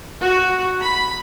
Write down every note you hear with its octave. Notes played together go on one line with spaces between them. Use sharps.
F#4
B5